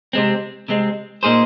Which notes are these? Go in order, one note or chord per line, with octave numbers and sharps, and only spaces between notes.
C3 G#3 C4
C3 G#3 C4
A#2 A#3 D#4 G#4 C5